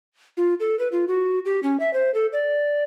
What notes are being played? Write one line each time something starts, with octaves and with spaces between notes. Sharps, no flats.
F4
A4
B4
F4
F#4
G4
C#4
E5
C5
A4
D5